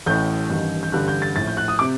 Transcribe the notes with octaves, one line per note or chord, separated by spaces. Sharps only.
A1 A2 G6
A1 G2 D#3
G6
A1 G2 D3 F#6
G6
A6
A#1 A2 A6
G6
F#6
D#6
C3 D6